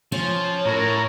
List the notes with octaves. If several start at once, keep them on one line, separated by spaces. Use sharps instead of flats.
F3 C#4
A2 A#4 C#5 A#5